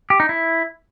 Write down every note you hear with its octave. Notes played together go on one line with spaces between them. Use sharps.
G4
D#4
E4